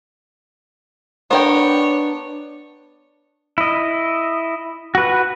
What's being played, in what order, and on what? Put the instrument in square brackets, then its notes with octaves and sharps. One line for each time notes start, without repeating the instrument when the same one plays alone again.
[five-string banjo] B3 A#4 G5 [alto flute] D4 [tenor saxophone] C#5
[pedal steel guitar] E4 D#5
F#4 B4